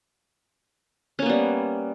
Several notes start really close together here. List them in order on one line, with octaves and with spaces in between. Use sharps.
C#4 A#3 B3 G3